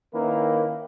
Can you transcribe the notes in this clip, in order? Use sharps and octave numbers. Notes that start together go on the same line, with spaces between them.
D#3 A#3 C#4 E4 A#4 B4